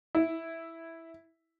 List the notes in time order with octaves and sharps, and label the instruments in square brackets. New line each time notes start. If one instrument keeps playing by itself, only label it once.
[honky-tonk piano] E4